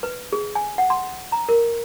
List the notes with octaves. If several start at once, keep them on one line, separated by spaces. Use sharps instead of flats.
B4
G#4
G#5
F#5
C6
A#5
A#4